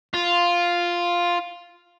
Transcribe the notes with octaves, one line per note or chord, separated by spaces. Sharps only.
F4